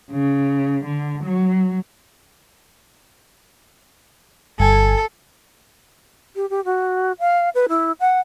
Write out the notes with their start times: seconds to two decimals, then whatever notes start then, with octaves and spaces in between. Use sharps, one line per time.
0.11 C#3
0.85 D3
1.24 F#3
4.60 G1 A4 G#5
6.36 G4
6.50 G4
6.65 F#4
7.20 F5
7.55 B4
7.69 E4
8.00 F#5